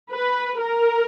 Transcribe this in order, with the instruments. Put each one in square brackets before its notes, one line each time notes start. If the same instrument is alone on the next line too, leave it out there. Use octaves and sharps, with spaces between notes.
[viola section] B4
A#4